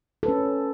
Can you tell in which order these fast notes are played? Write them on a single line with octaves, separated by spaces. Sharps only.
A4 B4 C#4